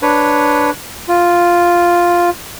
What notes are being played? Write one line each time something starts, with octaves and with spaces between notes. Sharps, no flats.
D4 B4 C#5
F4